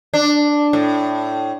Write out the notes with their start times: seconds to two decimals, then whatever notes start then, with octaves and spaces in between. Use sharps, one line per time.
0.14 D4
0.73 A2